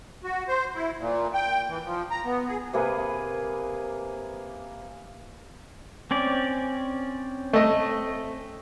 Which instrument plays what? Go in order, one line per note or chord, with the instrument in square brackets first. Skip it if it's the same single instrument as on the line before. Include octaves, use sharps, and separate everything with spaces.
[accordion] F#4
C5
E4
A#2
G5
E3
F3
A#5
B3
G#4
[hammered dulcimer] C3 A#3 G#4 B4
[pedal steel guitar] C4 C#4 D5
[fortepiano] A3 D#5